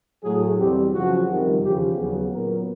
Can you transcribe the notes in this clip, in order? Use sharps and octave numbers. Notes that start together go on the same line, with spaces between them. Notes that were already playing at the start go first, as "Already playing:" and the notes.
A2 F#3 A3 G#4
E2 B2 G3 C4 G4
F#2 C#3 F3 F#4
F2 C3 D#3 G3
E2 C#3 F3 G4
D#2 C#3 F#3 B3 G#4
A#2 F#3 B3 A#4